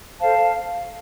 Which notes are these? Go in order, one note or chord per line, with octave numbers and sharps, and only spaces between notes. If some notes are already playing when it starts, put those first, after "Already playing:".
A4 C5 F5 A5